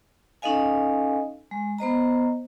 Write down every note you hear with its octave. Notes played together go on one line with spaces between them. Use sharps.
C#4 D#4 A4 D#5 F5 G#5
G#3
B3 C5 D#5 A#5